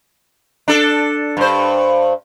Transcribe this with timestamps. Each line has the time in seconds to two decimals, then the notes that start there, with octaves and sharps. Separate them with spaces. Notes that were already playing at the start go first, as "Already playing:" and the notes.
0.68 D4 A4
1.37 G2 C5